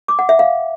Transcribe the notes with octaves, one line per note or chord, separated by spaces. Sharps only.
D6
F#5
E5
F5